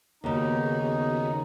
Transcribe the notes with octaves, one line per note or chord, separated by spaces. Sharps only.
D#2 C#3 B3 D#4 F#4 G#4